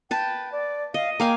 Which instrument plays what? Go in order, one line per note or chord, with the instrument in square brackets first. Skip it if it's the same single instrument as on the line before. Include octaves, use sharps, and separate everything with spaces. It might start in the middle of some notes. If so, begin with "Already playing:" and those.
[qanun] B4 A5 [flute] G5
[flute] D5
[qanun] D#5 [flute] F5
[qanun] A#3 F5 G#5 [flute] G5